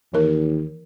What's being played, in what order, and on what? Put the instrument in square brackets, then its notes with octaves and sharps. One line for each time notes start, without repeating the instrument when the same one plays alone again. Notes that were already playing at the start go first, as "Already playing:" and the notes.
[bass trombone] D#2 [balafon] E3 A#4